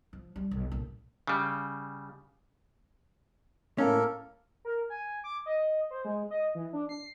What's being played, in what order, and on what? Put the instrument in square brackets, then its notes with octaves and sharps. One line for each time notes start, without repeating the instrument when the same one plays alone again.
[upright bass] F3
G3
B1
A#1
[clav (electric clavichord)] C#3 G3
[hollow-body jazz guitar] A2 C#4 [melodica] A#3 A4 A#4
[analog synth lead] A#4
G#5
D6
D#5
C5
G#3
D#5
E3
D4
C7